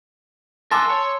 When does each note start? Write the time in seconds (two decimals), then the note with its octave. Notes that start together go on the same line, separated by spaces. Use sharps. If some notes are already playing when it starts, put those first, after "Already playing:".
0.71 A#4 F#5 G#5 A5 C6 D6 E6
0.90 C#5